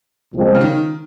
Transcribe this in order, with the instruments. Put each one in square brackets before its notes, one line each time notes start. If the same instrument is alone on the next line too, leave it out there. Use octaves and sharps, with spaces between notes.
[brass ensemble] C2 A#2 F3 G#3 C4
[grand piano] C#3
D#3